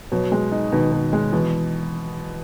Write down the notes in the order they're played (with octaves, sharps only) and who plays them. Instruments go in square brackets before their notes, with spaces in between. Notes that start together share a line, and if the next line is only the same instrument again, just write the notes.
[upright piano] B2 [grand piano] F#3
[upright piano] G#3
D#4
[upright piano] B2 [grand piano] D#3
[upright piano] B2
G#3
[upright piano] B2 [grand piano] E3